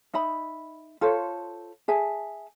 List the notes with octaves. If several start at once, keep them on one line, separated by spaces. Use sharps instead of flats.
D#4 D#5 E5 B5
F4 A4 C5 C#5
G#4 E5 G#5 A5